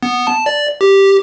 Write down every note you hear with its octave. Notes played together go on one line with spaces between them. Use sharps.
B3
A5
D5
G4